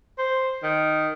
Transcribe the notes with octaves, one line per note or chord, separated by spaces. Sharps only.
C5
D#3